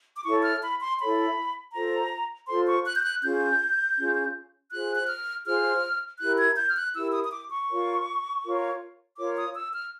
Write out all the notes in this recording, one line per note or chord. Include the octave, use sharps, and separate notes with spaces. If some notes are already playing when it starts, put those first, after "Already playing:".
D6
E4 A4 C#5 C#6
F6
B5
C6
E4 A4 C#5 B5
F4 A4 C5 A#5
F4 A4 C5 C6
C#6
F#6
G6
F#6
C#4 F4 G#4 G6
C#4 F4 G#4
F4 G#4 C5 F#6
F#6
F6
F4 G#4 C5 F6
E4 G4 A#4 F#6
G#6
G6
F6
F#6
E4 G4 A#4 E6
D#6
D#6
D6
C#6
F4 A#4 C#5
F4 A#4 C#5
F4 A#4 C#5 D6
D#6
E6
F6